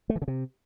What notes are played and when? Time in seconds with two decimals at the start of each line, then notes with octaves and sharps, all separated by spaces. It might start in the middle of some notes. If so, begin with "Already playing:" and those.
0.10 A3
0.16 E3
0.22 C#3
0.28 C3